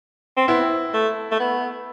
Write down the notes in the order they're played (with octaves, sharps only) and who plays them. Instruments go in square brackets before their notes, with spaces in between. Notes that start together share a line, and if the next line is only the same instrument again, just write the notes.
[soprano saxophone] C4
[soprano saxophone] B3 [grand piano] E4
[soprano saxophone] A3
A3
B3